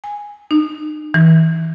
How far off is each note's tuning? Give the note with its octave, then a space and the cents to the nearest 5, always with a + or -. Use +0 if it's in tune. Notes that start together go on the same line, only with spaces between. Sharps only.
G#5 -5
D#4 -40
E3 -25